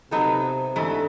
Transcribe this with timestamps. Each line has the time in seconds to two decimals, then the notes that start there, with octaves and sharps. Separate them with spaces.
0.11 C3 F#3 B3 D#4 F#4 A4
0.76 G#2 D3 E3 A3